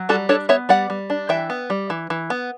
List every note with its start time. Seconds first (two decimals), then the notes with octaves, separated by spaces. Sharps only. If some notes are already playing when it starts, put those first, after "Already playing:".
Already playing: F#3
0.09 G3 F#4 A4
0.29 D4 A4 C#5
0.49 B3 C#5 E5
0.69 G3 D5 F#5
0.90 G3
1.10 D4
1.29 E3 E5 G5
1.50 B3
1.70 G3
1.90 E3
2.10 E3
2.30 B3